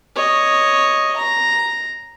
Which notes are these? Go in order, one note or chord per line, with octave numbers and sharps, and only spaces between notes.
C#5 D#5
A#5